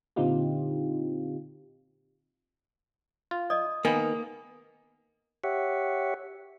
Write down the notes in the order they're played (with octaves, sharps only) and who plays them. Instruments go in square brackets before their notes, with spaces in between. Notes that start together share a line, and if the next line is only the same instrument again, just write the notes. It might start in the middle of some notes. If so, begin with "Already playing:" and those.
[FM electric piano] A#2 D3 C4 D#4 F4 G4
[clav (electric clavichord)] F4
[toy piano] D5 D#5 [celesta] D#6
[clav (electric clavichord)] D#3 B3 [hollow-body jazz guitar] A#3 [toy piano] G#5
[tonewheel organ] G4 C#5 E5 F#5